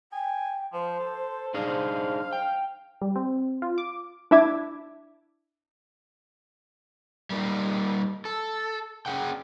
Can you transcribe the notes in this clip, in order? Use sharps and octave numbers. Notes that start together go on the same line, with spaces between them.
G5 G#5
F3 C5
A4
D4 D#4 G#4 C5 F5
G5
G3
C4
F4
D6
D4 E4 E5 D6 G#6
G3 A#3 D#4
A4
C#4 D4 G#4 F#5 G5